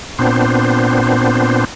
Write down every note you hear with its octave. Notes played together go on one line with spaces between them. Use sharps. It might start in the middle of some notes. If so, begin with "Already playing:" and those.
A#2 B3 C4 D4 C5